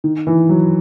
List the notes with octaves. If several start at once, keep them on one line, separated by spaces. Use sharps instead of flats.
D#3
E3
F#3